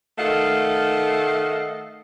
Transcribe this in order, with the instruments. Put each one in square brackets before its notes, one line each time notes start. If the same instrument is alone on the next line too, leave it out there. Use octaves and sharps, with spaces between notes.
[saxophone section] D#3 A3 A4 D#5 F5 F#5